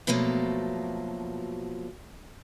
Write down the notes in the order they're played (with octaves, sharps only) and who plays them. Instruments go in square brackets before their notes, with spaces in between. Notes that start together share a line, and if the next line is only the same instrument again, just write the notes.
[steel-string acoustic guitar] B2 F3 F#3 A3 A#3